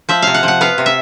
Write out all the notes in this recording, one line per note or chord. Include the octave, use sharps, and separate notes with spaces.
F3 E5
C3 F5
F#5
F3
F#5
B3 F5
C3
E5